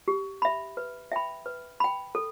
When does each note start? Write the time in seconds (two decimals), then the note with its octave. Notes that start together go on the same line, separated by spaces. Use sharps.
0.08 G4
0.42 E5 B5
0.77 B4
1.12 E5 G5 B5
1.46 B4
1.80 G5 B5
2.15 A4